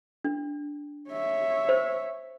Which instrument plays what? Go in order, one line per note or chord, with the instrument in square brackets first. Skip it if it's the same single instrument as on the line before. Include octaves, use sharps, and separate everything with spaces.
[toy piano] D4
[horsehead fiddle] C#5 E5
[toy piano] C5